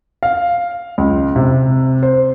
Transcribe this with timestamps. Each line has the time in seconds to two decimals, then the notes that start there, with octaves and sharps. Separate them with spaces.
0.23 F5
0.98 C#2
1.36 C3
2.03 C5